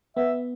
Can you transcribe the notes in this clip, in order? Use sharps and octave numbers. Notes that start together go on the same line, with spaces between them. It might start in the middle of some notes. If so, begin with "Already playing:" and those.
B3 E5